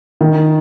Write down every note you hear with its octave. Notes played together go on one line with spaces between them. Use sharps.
D#3